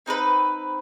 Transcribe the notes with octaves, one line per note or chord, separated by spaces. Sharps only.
C4 D#4 A#4 B4